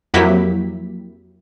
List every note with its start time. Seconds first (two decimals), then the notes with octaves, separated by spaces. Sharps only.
0.14 F2 F#3 A#3 E4 G4 B6